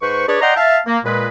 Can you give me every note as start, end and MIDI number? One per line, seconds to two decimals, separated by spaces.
0.01 0.26 44
0.01 0.26 71
0.01 0.26 72
0.01 0.26 85
0.27 0.38 62
0.27 0.38 68
0.27 0.38 71
0.27 0.38 73
0.27 0.38 74
0.40 0.54 74
0.40 0.54 75
0.40 0.54 78
0.40 0.54 79
0.40 0.54 82
0.40 0.54 84
0.56 0.78 76
0.56 0.78 77
0.56 0.78 81
0.86 0.97 58
1.04 1.27 46
1.04 1.27 56
1.04 1.27 71